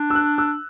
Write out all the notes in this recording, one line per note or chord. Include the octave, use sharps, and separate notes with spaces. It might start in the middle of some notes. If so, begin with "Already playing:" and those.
Already playing: D4
E6
F#6
E6